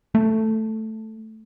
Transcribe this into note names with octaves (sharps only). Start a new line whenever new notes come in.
A3